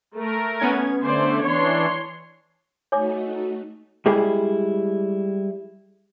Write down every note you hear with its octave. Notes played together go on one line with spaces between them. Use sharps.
A3 A#4
B3 C#4 G#6
D3 A3 C5 D5
E3 D4 C#5 C6
A3 D#4 F#4 C#5 G#5 D6
G3 G#3 E4 G4 G#4